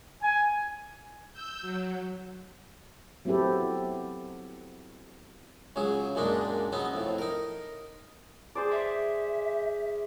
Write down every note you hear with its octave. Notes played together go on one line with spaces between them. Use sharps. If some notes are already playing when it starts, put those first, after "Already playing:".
G#5
E6 G6
F#3
F#3 B3 C4 E4 G4 A4
C#2 C#3 F#3 G#4
F#2 A#2 G#3 D4 D#4
F#3 B3 C#4 D#4
F2 A2
D#4 A#4
G#4 C5 D5
E5